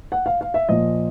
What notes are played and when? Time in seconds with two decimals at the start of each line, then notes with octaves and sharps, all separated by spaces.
0.12 F#5
0.26 F5
0.41 F5
0.54 E5
0.69 A#2 F3 D#5